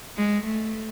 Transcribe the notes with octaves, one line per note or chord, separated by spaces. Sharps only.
G#3
A3